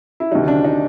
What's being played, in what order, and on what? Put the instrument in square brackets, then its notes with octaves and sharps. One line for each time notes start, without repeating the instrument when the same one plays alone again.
[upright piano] E4
D2 C3 D#3 F#3 D#4
D4
D#4